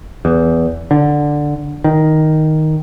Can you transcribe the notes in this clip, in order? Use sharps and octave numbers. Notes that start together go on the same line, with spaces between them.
E2
D3
D#3